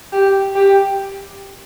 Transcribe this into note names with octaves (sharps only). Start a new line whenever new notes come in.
G4
G4